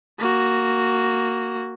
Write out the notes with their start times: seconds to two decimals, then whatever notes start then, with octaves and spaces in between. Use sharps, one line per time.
0.19 A#3 F#4